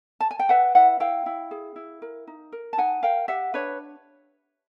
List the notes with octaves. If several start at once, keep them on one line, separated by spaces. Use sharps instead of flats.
A5
G#5
G5
B4 E5 F#5
E4 E5 F#5
E4 F5 G5
E4
G#4
E4
A#4
D#4
A#4
A5
D#4 F#5 G#5
A#4 F5 G5
G4 E5 F#5
D4 B4 C#5